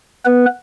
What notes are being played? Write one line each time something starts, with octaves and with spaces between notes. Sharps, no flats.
B3 B4